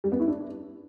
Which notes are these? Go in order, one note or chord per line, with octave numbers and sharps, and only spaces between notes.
G3
B3
E4
D4